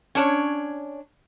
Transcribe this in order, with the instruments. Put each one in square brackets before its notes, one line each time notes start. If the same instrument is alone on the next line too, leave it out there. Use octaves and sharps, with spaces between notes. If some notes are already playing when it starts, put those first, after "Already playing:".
[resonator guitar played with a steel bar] C#4 D4 C#5